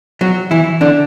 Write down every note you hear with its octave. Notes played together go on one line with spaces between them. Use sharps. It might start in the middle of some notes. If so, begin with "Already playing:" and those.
F#3 F#4
E3 E4
D3 D4